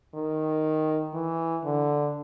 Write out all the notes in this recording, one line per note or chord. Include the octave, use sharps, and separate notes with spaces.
D#3
E3
D3